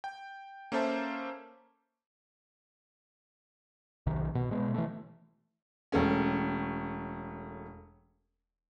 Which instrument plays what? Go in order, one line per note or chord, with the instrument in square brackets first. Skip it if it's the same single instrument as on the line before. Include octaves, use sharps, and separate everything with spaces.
[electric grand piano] G5
A#3 C#4 A4 C5 E5 A5
[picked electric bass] B1 C3 D#3
B2
B2 G#3 B3
E3 A3
[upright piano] E1 A3 C#4